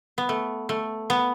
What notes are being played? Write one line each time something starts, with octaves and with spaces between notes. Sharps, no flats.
B3
A3
A3
B3